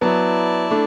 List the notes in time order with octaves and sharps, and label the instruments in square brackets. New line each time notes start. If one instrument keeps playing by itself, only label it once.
[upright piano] F#3 B3 [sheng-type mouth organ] E4 D5 A5
[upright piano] A3 D4